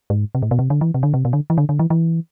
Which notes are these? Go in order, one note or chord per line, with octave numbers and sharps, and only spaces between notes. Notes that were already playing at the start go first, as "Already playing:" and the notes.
G#2
C3
A2
B2
C3
D3
E3
C3
D3
C3
B2
D3
E3
D3
D3
E3
E3